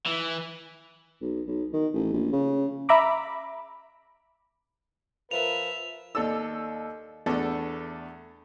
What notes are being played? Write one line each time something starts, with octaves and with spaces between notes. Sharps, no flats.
E3
B1
B1
D#3
A1
A#1
C#3
E5 A#5 B5 D6
F3 A#4 B4 E5 F7
D#2 A4 D5 E6
E2 A3 D4 A4